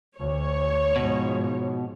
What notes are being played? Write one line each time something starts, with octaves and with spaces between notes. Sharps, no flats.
D2 C#5
G#2 B2 F3